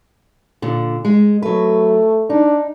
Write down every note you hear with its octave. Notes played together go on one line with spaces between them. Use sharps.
A#2 D3
G#3
F#3 A3 B4
D4 D#4